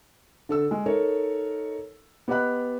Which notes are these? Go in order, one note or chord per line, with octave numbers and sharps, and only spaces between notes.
D3 A4 E6
G#3
D#4 A4 A#4 C#5
B3 G4 D#5 F#5 B5 F#6